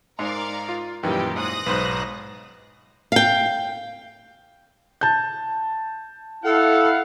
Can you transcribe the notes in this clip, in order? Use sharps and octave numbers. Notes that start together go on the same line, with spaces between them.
G#2 A#4 D5 F5
F4
F#2 A#2 D#3 E3 G3 G4
G#2 D#6 F#6 A#6
B1 G#2 B4 C5
F5 G5
A5 G6
E4 A4 F5 F#5